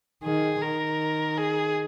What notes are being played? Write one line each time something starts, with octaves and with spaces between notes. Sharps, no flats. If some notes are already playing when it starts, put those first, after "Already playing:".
D#3 G#4
D#3 A#4
G#4